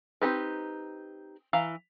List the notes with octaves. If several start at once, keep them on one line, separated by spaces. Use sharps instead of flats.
C4 D#4 G4 B4
E3 F5 A#5